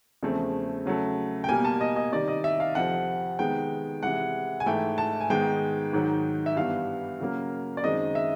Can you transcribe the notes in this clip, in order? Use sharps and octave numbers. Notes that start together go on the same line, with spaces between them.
E2 C#3 F3 A3 C4
C#3 F#3 A3
G5
B2 G3 A#3 G#5
A5
D#5
D#5
C3 D#3 G3 D5
D#5
E5
F5
F2 C3 F3 F#5
C3 D#3 G#3 B3 G5
C3 E3 G#3 F#5
G#5
G#2 E3 A3 G5
A5
G#5
G#2 D#3 G#3 B3 G5
G#2 D#3 F#3
E5
G2 E3 G3 B3 F5
C#3 F#3 A#3
D5
F#2 D#3 G#3 C4 D#5
E5